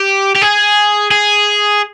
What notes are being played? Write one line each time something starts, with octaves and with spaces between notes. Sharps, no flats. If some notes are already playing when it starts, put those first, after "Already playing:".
Already playing: G4
G4
G#4
G#4